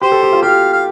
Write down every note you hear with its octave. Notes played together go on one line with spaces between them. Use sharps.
G4 C5
A4
G4
F4
G4 F5
F5